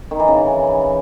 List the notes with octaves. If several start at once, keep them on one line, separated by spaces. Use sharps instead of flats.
D#3
E3
C#3